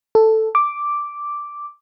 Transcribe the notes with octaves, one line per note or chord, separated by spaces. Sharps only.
A4
D6